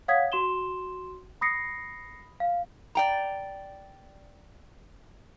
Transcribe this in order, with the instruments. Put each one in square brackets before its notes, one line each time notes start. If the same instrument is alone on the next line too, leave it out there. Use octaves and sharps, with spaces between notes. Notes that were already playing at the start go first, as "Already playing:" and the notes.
[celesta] C#5 F5 F#5 D#6 G#6 B6
F#4 C6 E7 G7
B5 D#6 A#6 C7 C#7
F5
[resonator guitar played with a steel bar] D5 G5 A#5